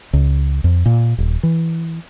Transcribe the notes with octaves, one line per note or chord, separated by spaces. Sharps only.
C#2
F2
A#2
D#1
E3